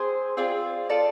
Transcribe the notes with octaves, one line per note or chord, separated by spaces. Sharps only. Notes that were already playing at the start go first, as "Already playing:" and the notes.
Already playing: C4 G#4 C5 G#5
C4 F4 G#4 D5
F4 A4 D5